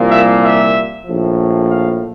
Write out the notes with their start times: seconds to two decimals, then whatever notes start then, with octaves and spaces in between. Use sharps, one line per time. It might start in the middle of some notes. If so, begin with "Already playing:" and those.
Already playing: C2 A#2 F3 A#3
0.11 E5
0.42 E5
1.06 A#1 A2 F3
1.69 F5